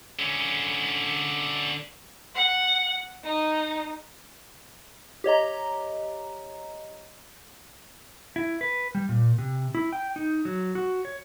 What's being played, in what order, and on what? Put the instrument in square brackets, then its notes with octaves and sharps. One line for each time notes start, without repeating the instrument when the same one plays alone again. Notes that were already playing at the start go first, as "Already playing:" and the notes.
[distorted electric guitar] D3 C#4
[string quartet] F#5
D#4
[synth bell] G4 C#5 D#5 A#5
[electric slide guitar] E4
B4
G3
A#2
C3
E4
G5
D#4
F#3
F#4
C#5